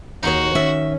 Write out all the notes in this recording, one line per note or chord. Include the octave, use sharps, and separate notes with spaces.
D#2 D#4 F#4 G#4 C#5
D#3 C#4 E5